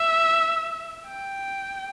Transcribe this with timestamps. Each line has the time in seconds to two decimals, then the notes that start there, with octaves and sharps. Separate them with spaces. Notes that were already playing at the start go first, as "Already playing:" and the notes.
Already playing: E5
1.07 G5